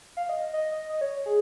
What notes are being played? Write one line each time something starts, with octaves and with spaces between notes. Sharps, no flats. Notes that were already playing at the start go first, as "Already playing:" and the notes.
F5
D#5
D#5
D#5
D#5
C#5
G#4